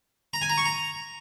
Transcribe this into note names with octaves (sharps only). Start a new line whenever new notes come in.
A#5
G#5
A#5
C#6
A#5